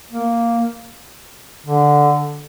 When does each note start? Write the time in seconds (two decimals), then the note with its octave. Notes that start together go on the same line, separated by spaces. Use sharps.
0.12 A#3
1.67 D3